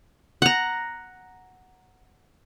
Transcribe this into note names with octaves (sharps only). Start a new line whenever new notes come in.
F#5 A#5